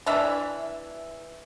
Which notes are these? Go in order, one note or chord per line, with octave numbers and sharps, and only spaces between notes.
E3 D4 E5